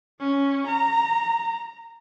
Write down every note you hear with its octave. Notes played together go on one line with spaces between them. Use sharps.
C#4
A#5